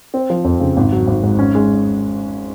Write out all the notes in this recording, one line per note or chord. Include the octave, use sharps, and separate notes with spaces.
C4
F3
F2
C#3
G#1
F#3
G#1
G#2
C#4
G#3